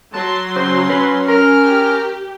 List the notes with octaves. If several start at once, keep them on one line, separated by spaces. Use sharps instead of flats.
F#3 A5 C6
C#3 C5
C#4 B4
A#4 F6
G4